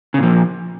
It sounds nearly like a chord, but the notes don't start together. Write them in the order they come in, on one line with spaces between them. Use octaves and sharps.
C#3 A#2 F3